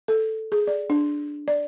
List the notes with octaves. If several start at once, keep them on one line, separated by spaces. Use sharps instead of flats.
A4
G#4
D5
D4
D5